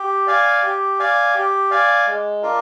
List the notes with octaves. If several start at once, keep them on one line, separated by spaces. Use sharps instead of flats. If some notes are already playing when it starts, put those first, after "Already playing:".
Already playing: G4
D5 F5 G#5
G4
D5 F5 G#5
G4
D5 F5 G#5
G#3
D4 F4 A#4